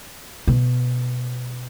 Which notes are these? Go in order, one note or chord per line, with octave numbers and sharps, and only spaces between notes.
B2